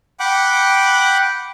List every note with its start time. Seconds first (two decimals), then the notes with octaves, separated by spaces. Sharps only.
0.20 F#5 G5 B5 D6 F#6